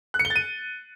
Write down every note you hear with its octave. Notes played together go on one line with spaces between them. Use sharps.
F#6
C#7
G7
A6
D#7